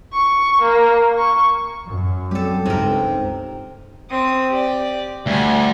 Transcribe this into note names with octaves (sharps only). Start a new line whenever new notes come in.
C#6
A#3
C#6
F#2
F#3 G3 C4 G4 A4
C#2 G2 C3 D#4 A#4
C4 D#6
G4 D5
D2 G3 G#5